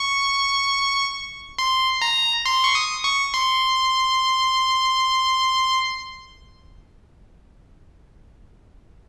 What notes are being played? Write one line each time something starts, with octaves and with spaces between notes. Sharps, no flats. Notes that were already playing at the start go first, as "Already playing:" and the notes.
Already playing: C#6
C6
A#5
C6
C#6
D#6
C#6
C6